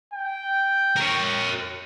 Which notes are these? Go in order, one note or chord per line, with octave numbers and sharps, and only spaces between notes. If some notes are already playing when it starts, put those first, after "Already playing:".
G5
A#4 C#5